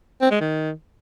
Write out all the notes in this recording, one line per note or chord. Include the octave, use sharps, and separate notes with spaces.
C4
G#3
D#3